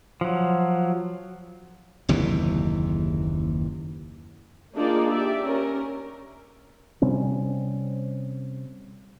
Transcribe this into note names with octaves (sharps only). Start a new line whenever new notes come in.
F3 F#3
F#1 D#2 C3 E3
A#3 D4 D#4 F4 G#4 D5
G4 D5 E5
C#4 A#4
C3 G3 C4 C#4